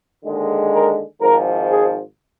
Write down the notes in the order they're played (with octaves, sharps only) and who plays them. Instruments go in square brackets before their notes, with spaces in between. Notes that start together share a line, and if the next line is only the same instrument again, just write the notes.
[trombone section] D#2 D3 G#3
A#4
G#1 G#2 F3 A#4
G#4